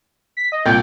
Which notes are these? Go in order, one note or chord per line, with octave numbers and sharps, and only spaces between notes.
B6
D#5
C2 A#2 G5